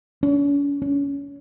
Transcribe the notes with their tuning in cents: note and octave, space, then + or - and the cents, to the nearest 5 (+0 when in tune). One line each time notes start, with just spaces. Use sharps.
C#4 +45
C#4 +25